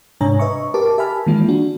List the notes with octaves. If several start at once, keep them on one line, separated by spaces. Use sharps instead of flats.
G#2 C3 D4 C#5 G#5 A#5
B4 D#5 E5 C#6
G4 A#4 B4 A5 D6
G4 E5 G#5 A5 B5 F6
D#3 E3 G#3 A#3 F4
D4 F#4